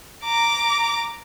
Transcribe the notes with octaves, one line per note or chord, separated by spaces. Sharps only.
A#5 D6